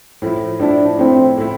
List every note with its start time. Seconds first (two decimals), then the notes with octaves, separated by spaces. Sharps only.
0.22 A2 F3 A3 E4
0.60 A2 F3 A3 D4 E4
0.98 A2 F3 A3 C4 E4
1.38 A2 F3 A3 E4